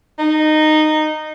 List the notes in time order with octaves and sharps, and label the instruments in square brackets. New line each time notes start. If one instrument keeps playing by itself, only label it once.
[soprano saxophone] D#4